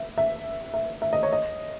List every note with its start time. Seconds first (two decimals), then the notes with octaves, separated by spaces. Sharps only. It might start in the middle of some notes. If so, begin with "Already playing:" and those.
Already playing: E5
0.18 E5
0.74 E5
1.02 E5
1.13 D#5
1.23 C#5
1.33 D#5